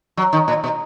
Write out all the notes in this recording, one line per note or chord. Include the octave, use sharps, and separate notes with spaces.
F#3
D#3
A#2
B2